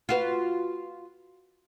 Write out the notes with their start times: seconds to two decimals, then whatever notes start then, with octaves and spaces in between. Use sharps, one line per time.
0.09 F4 F#4 B4